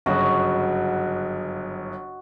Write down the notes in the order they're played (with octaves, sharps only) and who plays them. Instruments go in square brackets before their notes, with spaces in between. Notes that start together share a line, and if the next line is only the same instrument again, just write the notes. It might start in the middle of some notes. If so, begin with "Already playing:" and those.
[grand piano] G1 F#2 C#3 [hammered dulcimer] F#4 D#5